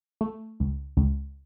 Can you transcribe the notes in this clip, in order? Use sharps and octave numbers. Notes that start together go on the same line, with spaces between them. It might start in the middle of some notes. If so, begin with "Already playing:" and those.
A3
C#2
C#2